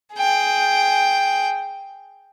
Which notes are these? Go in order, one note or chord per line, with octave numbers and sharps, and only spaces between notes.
G#4 G5